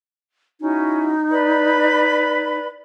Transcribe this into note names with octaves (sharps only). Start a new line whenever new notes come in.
C#4 D#4 E4 F#4
B4 D5 B5